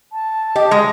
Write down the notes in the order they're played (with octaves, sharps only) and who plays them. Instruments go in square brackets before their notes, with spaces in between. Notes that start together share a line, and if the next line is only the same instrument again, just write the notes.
[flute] A5
[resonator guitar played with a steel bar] G4 [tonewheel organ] D#5
[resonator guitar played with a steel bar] G#3